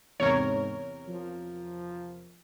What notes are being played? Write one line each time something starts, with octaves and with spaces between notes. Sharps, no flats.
E2 G#2 C3 A#4 C#5
F3